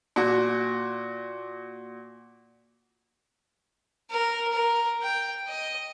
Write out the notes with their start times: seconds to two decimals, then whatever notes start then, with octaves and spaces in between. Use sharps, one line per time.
0.16 A#2 F#4
4.10 A#4
4.52 A#4
5.03 G5
5.47 D#5